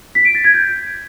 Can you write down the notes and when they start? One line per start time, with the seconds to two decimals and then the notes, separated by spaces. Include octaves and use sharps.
0.15 B6
0.25 D7
0.35 A6
0.44 G#6
0.54 G6